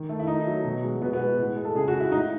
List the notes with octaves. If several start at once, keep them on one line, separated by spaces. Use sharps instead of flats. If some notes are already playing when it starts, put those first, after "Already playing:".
Already playing: D#3
A3
E4
A3 D#4
F#3
B2
G#3
B2 B3
B3
G#3
A2
G#3
A4
C#3 G#4
F#4
G#3
E4
A2 D#4